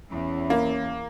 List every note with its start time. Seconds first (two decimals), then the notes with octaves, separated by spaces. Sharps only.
0.10 E2 E3 C#4
0.50 A#3